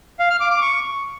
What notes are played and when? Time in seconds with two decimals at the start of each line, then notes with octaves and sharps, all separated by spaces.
0.19 F5
0.30 F6
0.40 D6
0.51 D6
0.61 C#6